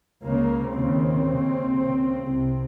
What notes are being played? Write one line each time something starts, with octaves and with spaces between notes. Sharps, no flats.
C#2 C#3 A#3
D#2 C#3 C4
D#2 C#3
C#2 C#3
C2 C3